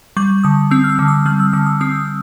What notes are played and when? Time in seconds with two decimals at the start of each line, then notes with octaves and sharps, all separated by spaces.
0.17 G3 C#6
0.44 D3 D#6
0.71 C4 E6
0.84 F6
0.89 E6
0.99 D3
1.08 D#6
1.26 G3 F6
1.40 E6
1.53 D3 E6
1.66 D#6
1.80 C4 D#6